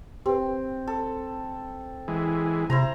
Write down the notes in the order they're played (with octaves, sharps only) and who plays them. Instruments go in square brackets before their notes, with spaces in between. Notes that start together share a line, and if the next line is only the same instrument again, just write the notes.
[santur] C4 [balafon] G4 B4
[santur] A4
[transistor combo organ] E3 G#3
[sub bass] C3 [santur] E4 C5 A#5